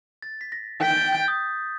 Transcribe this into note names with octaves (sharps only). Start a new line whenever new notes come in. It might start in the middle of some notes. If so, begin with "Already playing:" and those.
A6
B6
A#6
G5 B6
A6
G6
D#6